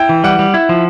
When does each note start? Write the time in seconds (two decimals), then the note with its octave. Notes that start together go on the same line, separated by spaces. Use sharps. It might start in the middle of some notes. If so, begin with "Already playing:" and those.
Already playing: E4 G5
0.09 E3
0.24 G3 F#5
0.39 G3
0.54 E4
0.69 F3